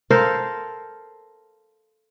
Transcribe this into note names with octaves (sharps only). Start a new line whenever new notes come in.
A4 A#4 C5 F5